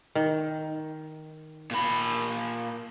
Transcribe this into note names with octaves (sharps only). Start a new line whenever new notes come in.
D#3
A#2 B5